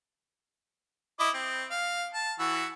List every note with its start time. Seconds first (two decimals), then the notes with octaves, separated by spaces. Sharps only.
1.19 E4 D#5 D6
1.34 C4
1.71 F5
2.14 A5
2.39 E3 F#4 E6